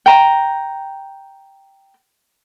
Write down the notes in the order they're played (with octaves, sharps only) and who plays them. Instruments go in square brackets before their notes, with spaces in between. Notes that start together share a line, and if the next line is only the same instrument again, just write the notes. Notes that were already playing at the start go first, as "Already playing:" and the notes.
[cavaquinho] G5 A#5